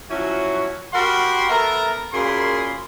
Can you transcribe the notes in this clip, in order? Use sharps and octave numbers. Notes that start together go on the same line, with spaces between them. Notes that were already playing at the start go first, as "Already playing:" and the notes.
F3 F#3 C#4 E4 F#4
F#4 G4 A#4 F#5 B5 C6
B3 A4 A#4 E5 A#5
F#2 A#2 A#3 G#4 B5 C6